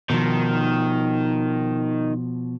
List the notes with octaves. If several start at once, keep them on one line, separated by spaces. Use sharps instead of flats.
B2 D#3 F3